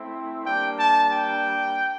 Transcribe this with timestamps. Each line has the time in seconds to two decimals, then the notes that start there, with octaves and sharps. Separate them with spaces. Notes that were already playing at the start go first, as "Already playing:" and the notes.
Already playing: A3 C4 E4
0.45 G3 A#3 D4 G5
0.78 A5
1.13 G5